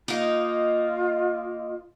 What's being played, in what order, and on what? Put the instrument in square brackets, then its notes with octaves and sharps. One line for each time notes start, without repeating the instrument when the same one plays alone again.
[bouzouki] A#3 D#4 [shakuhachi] F4